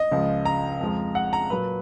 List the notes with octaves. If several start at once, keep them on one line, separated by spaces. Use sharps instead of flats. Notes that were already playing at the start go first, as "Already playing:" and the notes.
Already playing: D#5
C#2 C#3 F3 G#3
A#5
F2 F3 G#3
F#5
A#5
A#2 F#3 B4